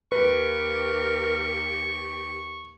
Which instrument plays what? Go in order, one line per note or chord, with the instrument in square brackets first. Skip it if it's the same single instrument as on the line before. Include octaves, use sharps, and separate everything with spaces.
[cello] D#2 G4 [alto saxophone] A#4 [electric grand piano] B4 [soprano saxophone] C#6